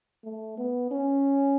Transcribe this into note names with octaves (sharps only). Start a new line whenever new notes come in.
A3
B3
C#4